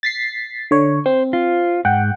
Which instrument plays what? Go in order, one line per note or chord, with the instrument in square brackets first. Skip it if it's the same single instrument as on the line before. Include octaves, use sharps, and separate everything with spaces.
[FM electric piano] A6 B6 C7
D3 C#5
[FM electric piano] C4 [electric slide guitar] C5
[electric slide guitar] F4
[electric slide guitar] G#2 [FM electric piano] F#5 G5